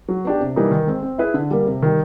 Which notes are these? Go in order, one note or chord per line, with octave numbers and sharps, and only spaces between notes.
F#3
B3 D4 G4
C3
E3 G3 A#3 D#4
D#3
G#3 C4
C4
E4 G#4 B4
D3
G3 A#3
C3
D#3 G3